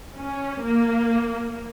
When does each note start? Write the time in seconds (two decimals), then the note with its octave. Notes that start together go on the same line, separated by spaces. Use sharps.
0.17 C#4
0.63 A#3